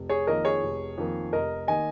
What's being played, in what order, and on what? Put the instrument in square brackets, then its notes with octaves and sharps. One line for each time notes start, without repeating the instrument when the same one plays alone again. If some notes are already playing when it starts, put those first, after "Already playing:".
Already playing: [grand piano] F1
G#4 C#5
F2 D#3 A#3 A#4 D#5
G#4 C#5
F1
F2 D#3 A#3
F1 A#4 D#5
D#3 A#3 D#5 G#5